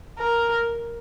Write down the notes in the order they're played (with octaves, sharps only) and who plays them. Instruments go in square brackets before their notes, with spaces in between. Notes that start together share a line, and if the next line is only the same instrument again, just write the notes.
[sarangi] A#4